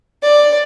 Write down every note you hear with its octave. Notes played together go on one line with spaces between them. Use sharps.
D5